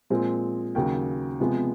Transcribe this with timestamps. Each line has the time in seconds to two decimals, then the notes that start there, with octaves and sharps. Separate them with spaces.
0.10 A#2 F3 G#3 C4
0.75 D#2 C#3 F#3 G5
1.40 C3 F3 G#3 B3